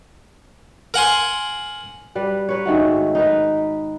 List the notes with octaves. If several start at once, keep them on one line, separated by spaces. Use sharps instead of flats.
A#4 F#5 G#5 C6
G3 B4
A#4 B4 C#5
G#2 D#3 A3 F#4
D#4 A#4 B4